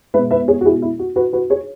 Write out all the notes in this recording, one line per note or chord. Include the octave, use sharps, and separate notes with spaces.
B2 G#3 B4 E5
B4 E5
G#4 C#5
F#4
E4 G#4
E4
F#4
F#4 B4
F#4 B4
G#4 C#5